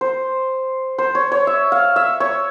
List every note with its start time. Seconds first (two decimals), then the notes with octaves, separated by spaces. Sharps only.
0.01 C5
0.98 C5
1.15 C#5
1.32 C#5
1.47 E5
1.72 F5
1.96 E5
2.20 C#5